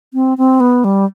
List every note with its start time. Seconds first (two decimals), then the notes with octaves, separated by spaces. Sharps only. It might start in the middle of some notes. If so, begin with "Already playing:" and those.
0.14 C4
0.38 C4
0.60 B3
0.84 G3